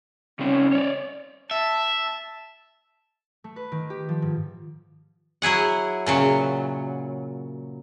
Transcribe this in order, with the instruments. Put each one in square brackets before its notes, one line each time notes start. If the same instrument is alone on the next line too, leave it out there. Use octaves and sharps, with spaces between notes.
[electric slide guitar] C#3 G3 C4 [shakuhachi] C#4
[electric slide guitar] C#5 D5
[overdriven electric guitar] E5 [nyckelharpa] A5
[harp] A3
B4
D#3
G4
F3
G#2
[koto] F#3 E4 G#4 F#5
A#2 C#3 F#3